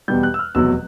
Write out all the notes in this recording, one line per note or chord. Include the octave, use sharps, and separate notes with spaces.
E2 B2 G3 G6
F#6
E6
F6
F1 E2 B2 F#3 E6